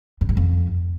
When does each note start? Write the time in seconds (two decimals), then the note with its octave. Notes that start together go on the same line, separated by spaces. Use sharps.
0.21 G2
0.29 G#2
0.37 F2